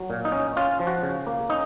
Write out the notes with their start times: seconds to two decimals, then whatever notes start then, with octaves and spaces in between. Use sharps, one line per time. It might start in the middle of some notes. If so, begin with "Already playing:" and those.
Already playing: F#3
0.10 A#2
0.25 D#4
0.32 C#4
0.57 C#4 F4
0.80 F3
0.87 F#4
1.03 C#3
1.27 A#3
1.50 C#4 D#4